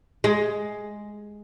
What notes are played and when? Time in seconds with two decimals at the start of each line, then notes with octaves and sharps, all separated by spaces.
0.24 G#3